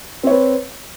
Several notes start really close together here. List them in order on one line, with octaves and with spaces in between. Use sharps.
C4 C#5 B4